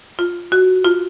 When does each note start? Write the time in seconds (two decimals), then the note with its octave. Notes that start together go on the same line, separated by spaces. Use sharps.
0.19 F4
0.52 F#4
0.85 F4